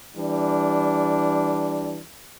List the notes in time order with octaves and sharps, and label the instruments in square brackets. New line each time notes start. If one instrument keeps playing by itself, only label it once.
[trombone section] E3 G3 D4